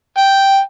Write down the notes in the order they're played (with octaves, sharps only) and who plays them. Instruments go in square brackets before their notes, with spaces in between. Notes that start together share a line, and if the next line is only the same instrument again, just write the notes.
[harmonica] G5